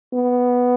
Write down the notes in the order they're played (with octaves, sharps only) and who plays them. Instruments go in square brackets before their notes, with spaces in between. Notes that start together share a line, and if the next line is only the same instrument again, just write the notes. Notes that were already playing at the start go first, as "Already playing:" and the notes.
[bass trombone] B3